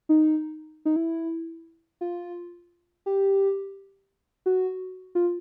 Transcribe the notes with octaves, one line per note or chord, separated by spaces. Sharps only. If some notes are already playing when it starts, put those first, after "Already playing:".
D#4
D#4
E4
F4
G4
F#4
F4